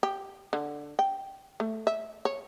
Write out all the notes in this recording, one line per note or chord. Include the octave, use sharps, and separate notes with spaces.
G4
D3
G5
A3
E5
C#5